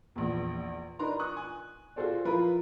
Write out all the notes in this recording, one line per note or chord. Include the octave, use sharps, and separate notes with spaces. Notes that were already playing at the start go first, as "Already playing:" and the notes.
A#1 E2
D4 D#4 A#4 B4 A#5 C6
C#6 D#6 F#6
G#5
F4 F#4 G#4 A4 C5 D5
F3 E4 F4 A#4 B4